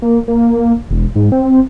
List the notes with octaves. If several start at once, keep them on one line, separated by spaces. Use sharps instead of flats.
A#3
A#3
E1
G#2
C4